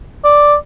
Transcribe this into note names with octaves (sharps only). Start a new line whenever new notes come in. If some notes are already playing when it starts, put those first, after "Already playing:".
D5